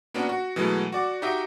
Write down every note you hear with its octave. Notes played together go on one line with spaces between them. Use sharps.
A#3 B3 C#4 D4 F#4
F#4
B2 E3 F#3 G#3 A3
F#4 D5 D6
D#4 F#4 G4 D#5 E5